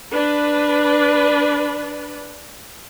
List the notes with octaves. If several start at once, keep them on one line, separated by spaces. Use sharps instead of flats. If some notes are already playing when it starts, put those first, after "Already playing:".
D4 B4